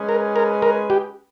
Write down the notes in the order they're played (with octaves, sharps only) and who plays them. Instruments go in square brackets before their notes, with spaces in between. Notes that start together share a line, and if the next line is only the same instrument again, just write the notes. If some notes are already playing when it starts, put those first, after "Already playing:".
Already playing: [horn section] G#3 C#4 G#4 B4
[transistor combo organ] A#4
A#4
A#4
G4